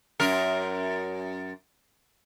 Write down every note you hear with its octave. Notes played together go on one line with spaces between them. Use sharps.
F#2 A#4